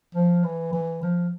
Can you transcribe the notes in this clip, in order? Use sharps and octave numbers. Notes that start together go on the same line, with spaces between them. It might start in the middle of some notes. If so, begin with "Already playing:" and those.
F3
E3
E3
F3